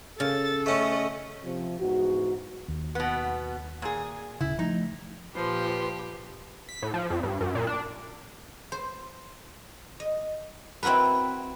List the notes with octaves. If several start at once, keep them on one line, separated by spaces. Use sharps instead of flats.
C#3 A4 A6
A3 C#4 D#5 F#5
C3 F3
E2 G#2 F#4
D#2
B2 B3
A#2 G#4
D#1 A#1 C#3 E4
F3 G3 A3 D#4
A#2 F3 G4 B4 C6
B6
A2
F3
F2
G2
F#2
A#2
D4
C5
D#5
C4 E4 F#4 A#4 B4